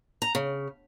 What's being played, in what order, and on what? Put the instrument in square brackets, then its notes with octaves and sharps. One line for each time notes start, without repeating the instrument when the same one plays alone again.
[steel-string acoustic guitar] A#5
C#3